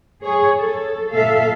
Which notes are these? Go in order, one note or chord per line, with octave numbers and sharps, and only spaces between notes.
G#4 C#5
A4
A#2 A4 E5 F5